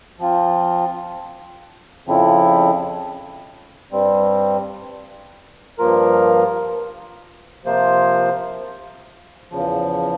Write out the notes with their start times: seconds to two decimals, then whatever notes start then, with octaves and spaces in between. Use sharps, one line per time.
0.20 F3 C4 F4
2.06 F2 C#3 F3 C4 E4
3.92 G2 G3 C4
5.78 G2 F3 A#3 F4 A#4
7.65 C3 F3 A#3 F4 C5
9.51 E2 C#3 F3